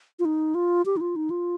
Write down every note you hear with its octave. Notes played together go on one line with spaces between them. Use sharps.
F4
D#4
F4
G4
D#4
F4
D#4
F4